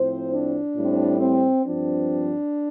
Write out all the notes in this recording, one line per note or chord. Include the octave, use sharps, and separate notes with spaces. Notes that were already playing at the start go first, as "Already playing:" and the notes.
Already playing: A2 F3 C4 C5
D4
A2 G3 C4
C4
G2 F3 C4 D4